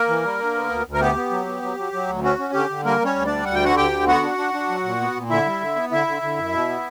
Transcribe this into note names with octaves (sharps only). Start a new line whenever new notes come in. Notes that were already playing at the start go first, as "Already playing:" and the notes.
Already playing: A#3 A#4
E3
G3
D3
B3
D2
D2
A#4
B3 G4
B3
F#3
B3
F#3
F#3
F#3
D2
C#4 F#4
C#4
D3 G4
D3
G3 A#3 A#4
G3 C#4 C#5
D2
G3 D4 D5
D2 F#5
G5
D3 F#4 F#5
D2 G4 G5
D3
B3 F#4 F#5
D4
D4
D4
F#3
A#2
B3
A#2
D3 E4 E5
G3
D3
B3
D3 E4 E5
D3
D3
F#2
B2
B3